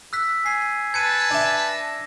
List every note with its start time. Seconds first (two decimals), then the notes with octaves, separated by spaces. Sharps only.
0.13 E6 F#6 B6
0.46 G#5 C7
0.94 B4 A5 G#6 C#7 D#7
1.31 D4 E5
1.69 A#6